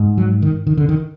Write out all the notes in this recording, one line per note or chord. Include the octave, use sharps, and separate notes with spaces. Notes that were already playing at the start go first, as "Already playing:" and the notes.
Already playing: G#2
F#3
D#3
D#3
D3
D#3